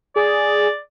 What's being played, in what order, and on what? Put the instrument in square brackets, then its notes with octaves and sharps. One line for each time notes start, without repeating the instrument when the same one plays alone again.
[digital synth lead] G#4 [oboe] D5